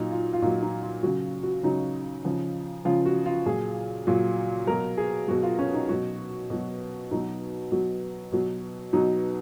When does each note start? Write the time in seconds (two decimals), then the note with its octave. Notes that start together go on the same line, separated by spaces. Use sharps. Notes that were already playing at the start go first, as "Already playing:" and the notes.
Already playing: A#2 F#3 D#4
0.11 F4
0.33 F4
0.42 A#2 F#3 D#4
0.62 D#4
0.83 F4
1.03 C#3 F#3 F#4
1.43 F#4
1.63 C#3 F#3 D#4
2.25 C#3 F3
2.85 C#3 F3 F4
3.06 F#4
3.26 F4
3.46 A#2 F#3 G#4
4.07 A#2 F#3
4.67 B2 F#3 A#4
4.97 G#4
5.28 B2 F#3 F#4
5.43 F4
5.59 C#4
5.74 D#4
5.89 B2 F#3 F#4
6.50 B2 F#3
7.11 B2 F#3 D#4
7.72 B2 F#3
8.32 B2 F#3
8.93 B2 F#3 D#4